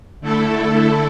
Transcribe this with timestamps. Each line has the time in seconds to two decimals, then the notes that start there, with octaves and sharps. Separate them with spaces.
0.21 D3 A3 E4 A4